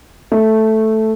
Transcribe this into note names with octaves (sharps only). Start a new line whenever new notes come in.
A3